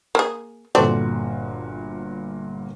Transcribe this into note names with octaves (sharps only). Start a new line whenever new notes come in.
A#3 G#4
G1 A#2 A3 C4 F#4 D5